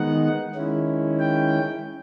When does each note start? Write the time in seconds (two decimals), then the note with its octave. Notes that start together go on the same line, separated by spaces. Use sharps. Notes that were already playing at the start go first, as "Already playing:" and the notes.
Already playing: D#3 G#3 B3 D#4 F#5
0.55 D#3 G#3 C#4 E4
1.19 G5